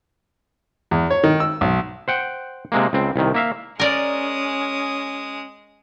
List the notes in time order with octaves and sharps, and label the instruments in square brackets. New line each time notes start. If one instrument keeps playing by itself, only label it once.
[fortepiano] E2
C#5
D#3
E6
B1
[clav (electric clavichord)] C5 F#5 G5
C3 G#3 A#3
C#2 C4
C2 D#3
A#3 E5 F5
[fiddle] G#3 D#6 [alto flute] C#4 [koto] A#4 D5